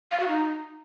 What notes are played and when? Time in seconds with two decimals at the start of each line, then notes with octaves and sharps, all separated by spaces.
0.11 F5
0.20 F#4
0.28 D#4